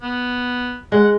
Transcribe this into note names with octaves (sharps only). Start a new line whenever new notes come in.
B3
G#3 F#5